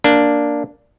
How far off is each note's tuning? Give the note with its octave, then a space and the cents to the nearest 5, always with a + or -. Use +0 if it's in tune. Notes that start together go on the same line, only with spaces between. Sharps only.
A#3 +0 D4 +0